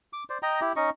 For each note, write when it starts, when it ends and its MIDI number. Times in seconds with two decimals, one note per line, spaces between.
0.13 0.24 86
0.30 0.38 72
0.30 0.38 74
0.43 0.60 75
0.43 0.60 79
0.43 0.60 82
0.61 0.73 64
0.61 0.73 67
0.76 0.90 61
0.76 0.90 63
0.76 0.90 75
0.76 0.90 85